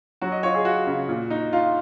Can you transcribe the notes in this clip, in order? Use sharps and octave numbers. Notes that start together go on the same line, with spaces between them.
F#3 F#4
D#5
F4 C#5
G#4
F4 F#4
C#3
A#2
D#4
D#4 F4